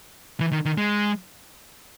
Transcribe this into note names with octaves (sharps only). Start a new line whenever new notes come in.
E3
D#3
D#3
G#3